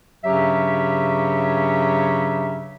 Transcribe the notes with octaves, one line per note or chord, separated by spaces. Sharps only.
G2 C#3 F#3 C#4 G4 E5